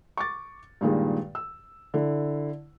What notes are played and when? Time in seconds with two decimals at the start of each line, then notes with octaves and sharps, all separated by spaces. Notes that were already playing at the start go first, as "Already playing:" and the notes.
0.17 C#6 D6 A6
0.81 G2 A#2 D#3 G#3
1.35 E6
1.94 D3 E4